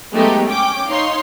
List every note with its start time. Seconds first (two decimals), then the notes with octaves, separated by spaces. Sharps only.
0.14 F#3 G#3 A3 B3 D#4 G4
0.47 C#4 G5 D6
0.88 D#4 C#5 F5 C6